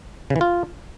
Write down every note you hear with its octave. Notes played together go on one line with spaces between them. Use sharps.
C#3
E3
F4